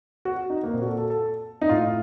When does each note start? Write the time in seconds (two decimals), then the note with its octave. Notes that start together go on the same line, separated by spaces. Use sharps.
0.25 F#4
0.50 D#4
0.64 A#3
0.73 A#2 C4
0.81 F#4
0.86 A4
0.98 A4
1.10 A4
1.61 D#4
1.69 A2 F4